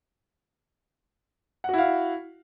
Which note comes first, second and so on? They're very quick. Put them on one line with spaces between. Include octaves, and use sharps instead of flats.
F#5 F#4 E4 F5